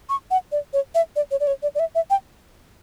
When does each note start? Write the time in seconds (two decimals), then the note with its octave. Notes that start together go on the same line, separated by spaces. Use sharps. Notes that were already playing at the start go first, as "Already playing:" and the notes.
0.09 C#6
0.31 F#5
0.52 D5
0.73 C#5
0.95 E5
1.16 D5
1.31 C#5
1.40 D5
1.47 C#5
1.63 D5
1.75 D5
1.79 E5
1.95 E5
2.10 G5